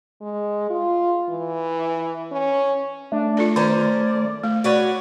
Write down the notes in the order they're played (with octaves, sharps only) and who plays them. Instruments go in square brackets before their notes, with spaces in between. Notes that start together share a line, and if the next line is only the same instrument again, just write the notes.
[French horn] G#3
F4
E3
C#4
[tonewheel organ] A3 [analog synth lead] D4
[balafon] F4 A4 D5
[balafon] D#3 [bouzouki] C#4 A#4 C5 [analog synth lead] D5
[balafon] A3
[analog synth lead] F#4 [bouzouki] B4 C#5 D5